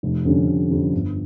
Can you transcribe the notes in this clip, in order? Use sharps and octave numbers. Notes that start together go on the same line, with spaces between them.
F1
F2 D3 G3 C#4
F1
F2 D3 G3 C#4
G1